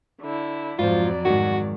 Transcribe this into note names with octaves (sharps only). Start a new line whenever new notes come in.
D3 E4
F2 G#2 F3 F#3 F4 D5
G#2 D#3 F#4